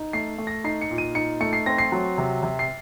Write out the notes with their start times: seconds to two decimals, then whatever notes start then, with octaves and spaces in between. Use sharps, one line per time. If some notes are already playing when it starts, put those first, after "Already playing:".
Already playing: D#4
0.13 A3 C7
0.38 A3
0.47 A#6
0.64 D#4 C7
0.81 C#7
0.90 A#2
0.98 D#7
1.15 D#4 C#7
1.41 A3 C#7
1.53 C7
1.66 C4 A#6
1.78 C7
1.92 F#3
2.18 C3
2.43 C3
2.59 C7